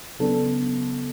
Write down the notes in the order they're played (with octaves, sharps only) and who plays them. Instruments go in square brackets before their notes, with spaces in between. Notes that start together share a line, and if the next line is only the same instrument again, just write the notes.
[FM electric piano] C#3 F#3 B3 D4 A4